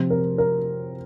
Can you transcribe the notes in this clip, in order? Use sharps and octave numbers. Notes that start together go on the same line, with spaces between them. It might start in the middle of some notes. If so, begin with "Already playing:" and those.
Already playing: C3 F3 C4
A#4
A#4